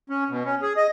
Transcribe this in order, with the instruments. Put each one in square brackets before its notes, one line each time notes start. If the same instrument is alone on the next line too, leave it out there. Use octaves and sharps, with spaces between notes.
[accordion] C#4
B2
C#4
G#4
D#5